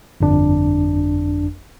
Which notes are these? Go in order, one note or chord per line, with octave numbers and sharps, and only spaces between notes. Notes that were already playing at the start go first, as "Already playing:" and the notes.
G1 F2 D4